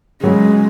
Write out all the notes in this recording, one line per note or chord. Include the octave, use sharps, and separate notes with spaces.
C#3 F#3 G#3